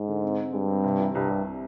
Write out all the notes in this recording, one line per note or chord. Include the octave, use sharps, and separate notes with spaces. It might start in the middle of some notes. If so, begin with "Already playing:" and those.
Already playing: G#2
D3
C4
C4
G2 G#3
C4
C3
E3
C2 G2
C2